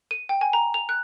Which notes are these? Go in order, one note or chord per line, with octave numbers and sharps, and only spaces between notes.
D#7
G5
G#5
A#5
F7
F#6